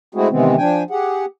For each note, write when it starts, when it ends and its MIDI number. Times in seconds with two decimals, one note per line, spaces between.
0.15 0.28 56
0.15 0.28 57
0.15 0.28 60
0.15 0.28 64
0.15 0.28 66
0.15 0.28 68
0.30 0.56 48
0.30 0.56 51
0.30 0.56 52
0.30 0.56 56
0.30 0.56 59
0.30 0.56 60
0.58 0.83 53
0.58 0.83 62
0.58 0.83 79
0.58 0.83 80
0.90 1.25 67
0.90 1.25 68
0.90 1.25 78